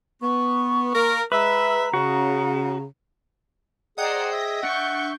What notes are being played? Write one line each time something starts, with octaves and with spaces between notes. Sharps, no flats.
B3 C#6
A#3 A#4
G#3 B4 E5 A#5
C#3 F#4
G#4 C5 D5 D#5 F#5 G5 A#5
E5 A#6
D4 F#5 C#6 G6